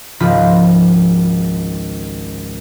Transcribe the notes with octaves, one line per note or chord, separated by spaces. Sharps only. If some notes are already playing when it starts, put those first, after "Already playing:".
G#1 C#2 F3 F4 B5